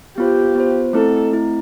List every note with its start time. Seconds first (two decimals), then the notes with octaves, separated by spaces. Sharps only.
0.18 B3 F4 G4 C5
0.55 B3 F4 C5
0.93 A3 C4 E4 A4
1.32 A3 C4 E4